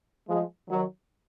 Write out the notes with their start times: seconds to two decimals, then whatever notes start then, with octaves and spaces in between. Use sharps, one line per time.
0.28 F3 G#3
0.70 D#3 F#3